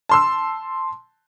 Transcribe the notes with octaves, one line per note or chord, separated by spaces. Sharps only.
A5 C6 E6